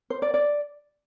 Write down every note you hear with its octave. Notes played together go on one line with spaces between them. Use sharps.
C5
D5
D5